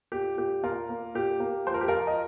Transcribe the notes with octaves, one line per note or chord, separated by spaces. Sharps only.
A#2 G4
A#2 G4
A#2 F4 A#4
A#3
A#2 G4
A#3
F3 C5
A#4
G4
F3 F4 A#4
D#5